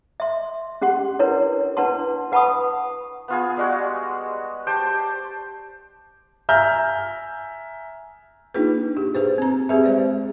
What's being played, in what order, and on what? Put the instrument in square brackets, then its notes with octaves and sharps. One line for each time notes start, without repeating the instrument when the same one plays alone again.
[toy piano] E5 C6
C#4 G4 F#5 C6
D4 E4 A#4 B4 C#5
D4 E4 B4 F#5 A5 C6
B4 F#5 A5 B5 C#6 D#6
[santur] B3 F4 G#4
G3 G#3 F#4
G4 C5 G5 A5
[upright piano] E5 G#5 A#5 F6 G6
[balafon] A#3 D4 D#4 F4 G#4 B4
G4
G#4 B4 C5
C4 A#5
C4 G4 G#4 B4 E5
G#3 C5 D5